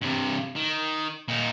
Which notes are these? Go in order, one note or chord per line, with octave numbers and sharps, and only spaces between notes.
G2 C3
D#3
A#2 D#4